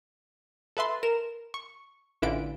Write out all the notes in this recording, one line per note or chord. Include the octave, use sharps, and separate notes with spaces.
A4 B4 E5 C6 A6
A#4 E7
C#6
A1 D3 E3 E4 F4 D7